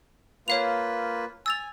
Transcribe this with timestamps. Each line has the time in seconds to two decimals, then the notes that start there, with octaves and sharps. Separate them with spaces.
0.48 A#3 F4 B4 C#5 F5 F7
1.46 G#5 E6 A6 F7